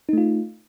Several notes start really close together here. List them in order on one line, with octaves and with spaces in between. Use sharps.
D#4 A3 F4